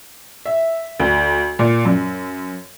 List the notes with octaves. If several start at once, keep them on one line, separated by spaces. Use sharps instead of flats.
E5
D2
A#2
F#2